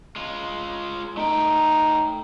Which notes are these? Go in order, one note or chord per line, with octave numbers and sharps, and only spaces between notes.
G#3 F4
A3 D#4 G5